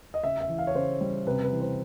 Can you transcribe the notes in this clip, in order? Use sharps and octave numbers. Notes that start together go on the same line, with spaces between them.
D#5
C#3 E5
E5
E3
F5
C#5
C#3 C5
G3
C3 B4
B4
E3
C5